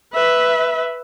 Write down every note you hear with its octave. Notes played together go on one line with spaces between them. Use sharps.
B4 E5